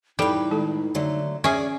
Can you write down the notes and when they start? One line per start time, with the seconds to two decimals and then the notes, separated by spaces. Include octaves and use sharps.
0.19 A2 G3 D#4 A4 B4
0.51 D#3 G#3 A4
0.95 D3 F#3 A3
1.44 C#4 G#4 D5 E5